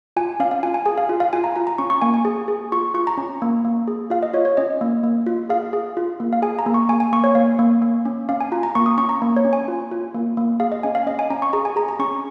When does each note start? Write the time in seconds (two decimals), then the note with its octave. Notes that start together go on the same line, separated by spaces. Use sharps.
0.16 F4 G#5
0.40 C#4 F5
0.51 F5
0.63 F4 G#5
0.74 G#5
0.85 G#4 G#5
0.98 F5
1.09 F4
1.20 F5
1.33 F4 G#5
1.44 A#5
1.56 F4 A#5
1.67 A#5
1.78 C#4 C#6
1.90 C#6
2.01 A#3 G#5
2.14 G#5
2.25 G#4
2.48 G#4
2.72 F4 C#6
2.94 F4 C#6
3.07 A#5
3.17 C#4
3.42 A#3
3.65 A#3
3.88 G#4
4.10 F4 F5
4.23 D#5
4.34 F4 C#5
4.45 C#5
4.57 C#4 D#5
4.81 A#3
5.04 A#3
5.27 F4
5.49 G#4 F5
5.73 G#4
5.97 F4
6.20 A#3
6.33 F5
6.42 G#4 G#5
6.59 A#5
6.66 A#3
6.74 C#6
6.89 A#3 G#5
7.00 G#5
7.13 A#3 C#6
7.24 C#5
7.35 A#3 F5
7.59 A#3
7.82 A#3
8.05 C#4
8.29 C#4 F5
8.41 G#5
8.52 F4 A#5
8.63 A#5
8.75 A#3 C#6
8.86 D#6
8.98 C#4 C#6
9.09 A#5
9.22 A#3
9.36 C#5
9.45 C#4
9.53 G#5
9.68 F4
9.91 F4
10.14 A#3
10.37 A#3
10.60 G#4 F5
10.72 D#5
10.83 C#4 G#5
10.95 F5
11.07 C#4 D#5
11.19 G#5
11.30 C#4 A#5
11.42 C#6
11.53 G#4 A#5
11.65 G#5
11.76 G#4 A#5
11.88 A#5
11.99 C#4 C#6